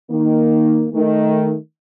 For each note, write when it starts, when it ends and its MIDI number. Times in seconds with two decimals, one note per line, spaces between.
0.10 0.87 51
0.10 0.87 58
0.94 1.55 51
0.94 1.55 57